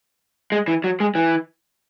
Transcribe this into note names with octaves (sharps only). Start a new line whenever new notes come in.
G#3
E3
F#3
G#3
E3